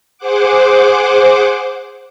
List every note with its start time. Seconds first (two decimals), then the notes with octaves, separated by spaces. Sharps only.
0.18 G#4 C5 F#5 D6